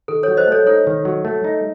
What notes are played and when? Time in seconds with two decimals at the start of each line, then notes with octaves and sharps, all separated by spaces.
0.08 D#3 A4
0.23 F#3 A4 C#5
0.37 C5 D#5
0.48 A3 A4 C#5
0.66 D#4 A4 C#5
0.87 D#3
1.05 F#3
1.25 A3
1.44 D#4